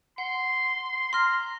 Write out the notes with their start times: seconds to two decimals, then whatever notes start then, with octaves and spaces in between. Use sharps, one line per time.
0.18 F#5 C6
1.13 A#5 C6 F6